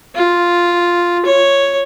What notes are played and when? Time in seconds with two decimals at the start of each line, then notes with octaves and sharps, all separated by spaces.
0.15 F4
1.26 C#5